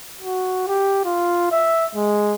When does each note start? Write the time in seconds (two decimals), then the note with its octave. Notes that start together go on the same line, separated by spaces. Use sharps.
0.21 F#4
0.67 G4
1.05 F4
1.52 E5
1.95 G#3